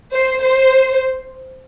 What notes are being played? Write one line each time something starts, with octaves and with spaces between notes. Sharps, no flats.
C5
C5